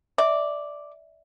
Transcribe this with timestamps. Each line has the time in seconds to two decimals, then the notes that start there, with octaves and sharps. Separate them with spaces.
0.18 D5 E5